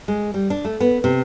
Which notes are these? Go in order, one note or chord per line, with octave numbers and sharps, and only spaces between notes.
G#3
G3
D4
A3
B3
C3